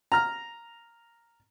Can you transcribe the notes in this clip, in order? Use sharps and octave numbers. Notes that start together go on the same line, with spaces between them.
A#5 F6